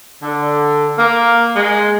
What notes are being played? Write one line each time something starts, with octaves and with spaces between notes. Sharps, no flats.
D3
A#3
G#3